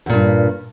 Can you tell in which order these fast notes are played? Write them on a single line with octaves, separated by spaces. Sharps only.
E2 A#2 G2